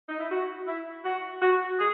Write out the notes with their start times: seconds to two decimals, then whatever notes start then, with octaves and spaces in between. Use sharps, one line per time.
0.09 D#4
0.19 E4
0.30 F#4
0.67 E4
1.04 F#4
1.41 F#4
1.78 G#4